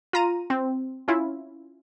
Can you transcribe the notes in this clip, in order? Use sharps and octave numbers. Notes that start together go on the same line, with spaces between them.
F4 A#5 D#7
C4
C#4 E4 F4